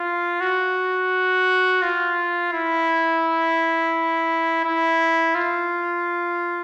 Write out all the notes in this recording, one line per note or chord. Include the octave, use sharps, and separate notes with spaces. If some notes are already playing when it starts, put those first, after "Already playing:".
Already playing: F4
F#4
F4
E4
E4
F4